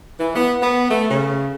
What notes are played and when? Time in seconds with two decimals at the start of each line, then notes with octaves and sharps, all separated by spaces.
0.20 E3
0.36 B3
0.62 B3
0.91 A3
1.10 C#3